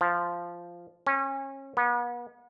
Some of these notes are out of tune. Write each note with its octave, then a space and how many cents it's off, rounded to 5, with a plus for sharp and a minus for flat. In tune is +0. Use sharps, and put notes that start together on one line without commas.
F3 -5
C#4 -30
B3 -40